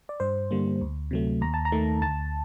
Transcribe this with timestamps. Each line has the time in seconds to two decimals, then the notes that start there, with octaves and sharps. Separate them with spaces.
0.09 D5
0.20 G2 C5
0.51 D3 G3 A#3
0.81 D2
1.11 C3 F#3 A3
1.41 D#2 A#5
1.54 A5
1.65 A#5
1.72 D#3 A3
2.02 D2 A5